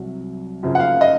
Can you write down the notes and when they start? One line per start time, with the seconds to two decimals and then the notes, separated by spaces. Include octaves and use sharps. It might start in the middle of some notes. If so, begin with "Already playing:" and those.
Already playing: C2 C3 F#3
0.63 F#2 C#3 F3
0.75 F#5
0.80 F5
1.01 D#5